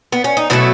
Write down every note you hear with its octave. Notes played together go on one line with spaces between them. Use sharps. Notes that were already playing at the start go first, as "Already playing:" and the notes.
B3
C#4
D#4
B2 F#3 A3 E4